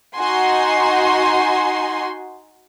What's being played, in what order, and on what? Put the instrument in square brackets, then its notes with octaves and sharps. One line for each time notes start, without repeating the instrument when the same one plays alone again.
[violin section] D#4 F#4 G#5 C6